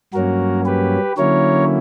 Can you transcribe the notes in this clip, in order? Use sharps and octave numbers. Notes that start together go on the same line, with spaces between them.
G2 F#3 A#3 C#4 F#4 A#4
G4 B4
D3 F#3 A#3 C#4 E4 A#4 C#5